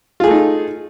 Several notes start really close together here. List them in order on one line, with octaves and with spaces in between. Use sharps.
F4 G#4 A3 D#4